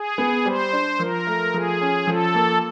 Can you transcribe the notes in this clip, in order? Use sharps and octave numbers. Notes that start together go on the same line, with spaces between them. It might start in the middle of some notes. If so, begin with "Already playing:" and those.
Already playing: G#4
B3
G3 C5
D4
F3 A#4
A3
F3 G#4
C#4
F3 A4
A#3